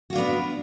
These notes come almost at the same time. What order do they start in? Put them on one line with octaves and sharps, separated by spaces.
F#4 F4 D4 B3